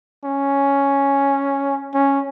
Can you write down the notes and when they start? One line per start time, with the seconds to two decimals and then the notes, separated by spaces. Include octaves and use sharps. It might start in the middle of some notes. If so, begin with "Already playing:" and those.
0.24 C#4
1.94 C#4